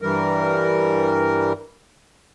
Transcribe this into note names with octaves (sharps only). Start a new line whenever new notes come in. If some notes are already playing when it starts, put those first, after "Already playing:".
G2 E3 G3 A#4